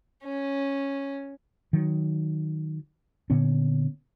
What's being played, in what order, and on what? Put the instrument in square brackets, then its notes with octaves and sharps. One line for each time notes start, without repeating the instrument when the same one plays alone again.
[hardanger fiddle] C#4
[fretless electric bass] D#3 F#3
A#2 D3 B3 C#4